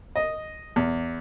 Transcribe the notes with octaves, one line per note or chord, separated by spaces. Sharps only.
D#5
E2